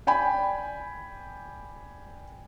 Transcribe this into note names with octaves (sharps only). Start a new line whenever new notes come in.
D5 G5 G#5 B5